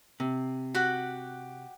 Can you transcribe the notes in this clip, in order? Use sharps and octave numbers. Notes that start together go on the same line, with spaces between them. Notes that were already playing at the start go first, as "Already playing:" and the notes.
C3
F#4 G4 F#5